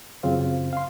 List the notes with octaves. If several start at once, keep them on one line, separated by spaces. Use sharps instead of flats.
F#2 C#3 C4 F4 F5
F5 C6